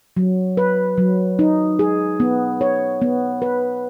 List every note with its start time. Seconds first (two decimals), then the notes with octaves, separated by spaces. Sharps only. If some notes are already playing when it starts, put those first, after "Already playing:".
0.17 F#3
0.57 B4
0.98 F#3
1.39 D#4
1.79 G#4
2.20 B3
2.61 C#5
3.02 B3
3.42 B4